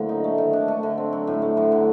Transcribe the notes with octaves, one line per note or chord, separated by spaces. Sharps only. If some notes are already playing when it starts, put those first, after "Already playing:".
Already playing: A2 D3 F#3 A#3 C4
D#4
A3
D#3
D4
A3
D3
C4
F#3
A2
A3
F#3
D3